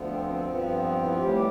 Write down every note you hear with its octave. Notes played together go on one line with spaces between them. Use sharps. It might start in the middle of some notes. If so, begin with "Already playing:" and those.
Already playing: D2 D3 F3 B3
C4
C4
G2 F3 B3
E4
F4
A2 E3 G3 G4